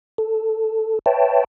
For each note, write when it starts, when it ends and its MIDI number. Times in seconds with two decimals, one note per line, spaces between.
0.18 0.99 69
1.06 1.44 71
1.06 1.44 73
1.06 1.44 76
1.06 1.44 79
1.06 1.44 81